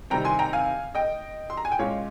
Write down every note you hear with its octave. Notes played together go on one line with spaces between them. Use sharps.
C3 D#3 G3 C4 G5 A#5
G#5 C6
G5 A#5
F5 G#5
D#5 G5
C6
A#5
G#5
G5
A#2 G#3 C#4 C#5 F5